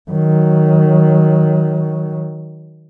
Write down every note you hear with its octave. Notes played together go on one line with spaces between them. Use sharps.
D#3 F#3